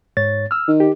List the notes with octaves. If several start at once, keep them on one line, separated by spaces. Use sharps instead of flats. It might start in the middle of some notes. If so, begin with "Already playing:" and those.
G#2 C#5 A6
E6 F6
D#3
G4